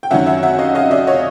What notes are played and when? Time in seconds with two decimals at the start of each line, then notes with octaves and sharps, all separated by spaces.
0.03 G5
0.11 F#2 D#3 F#3 E5 F#5
0.26 E5 F#5
0.43 E5 F#5
0.59 D#5 F5
0.75 D#5 F5
0.91 D5 E5
1.07 C#5 D#5